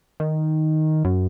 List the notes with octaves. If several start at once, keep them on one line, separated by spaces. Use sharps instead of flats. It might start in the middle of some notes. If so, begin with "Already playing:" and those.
D#3
F#2